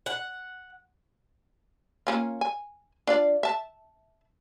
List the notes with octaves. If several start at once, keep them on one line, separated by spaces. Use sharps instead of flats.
F#5
A#3 C#4 F4
G#5
D4 F4 D5
E5 A5